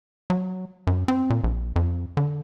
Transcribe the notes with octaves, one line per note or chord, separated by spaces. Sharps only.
F#3
F#2
C4
A#2
A#1
F2
D3